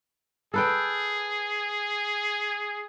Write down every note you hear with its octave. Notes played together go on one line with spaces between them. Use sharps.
G#4 A4 B4 G5